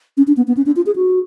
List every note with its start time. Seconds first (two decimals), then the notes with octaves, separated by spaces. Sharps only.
0.17 C#4
0.27 D4
0.37 B3
0.48 B3
0.57 C#4
0.66 D4
0.76 F4
0.86 G#4
0.96 F#4